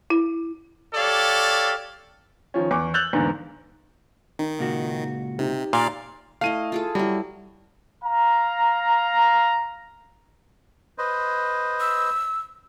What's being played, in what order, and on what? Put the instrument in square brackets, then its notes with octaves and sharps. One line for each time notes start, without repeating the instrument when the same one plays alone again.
[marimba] E4
[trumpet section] G4 A4 C#5 D5 F5
[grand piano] D#3 F3 C#4
E2 C#6 D6
E6 F#6 G6 A6 F7 F#7
E2 G#2 D3 A#3
[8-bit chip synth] D#3 [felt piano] D#4
[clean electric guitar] C#2 A#2 F#4
[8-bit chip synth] C3 [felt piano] D#4 G4
[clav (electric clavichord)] A#2 [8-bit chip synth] D5 F5
[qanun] A3 E4 D#5 [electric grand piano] F5 D#7
[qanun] F4 G#4 A4
[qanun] F#3 E4 [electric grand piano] G3
[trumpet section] F5 A#5
[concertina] B4 C5 D#5
[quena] E6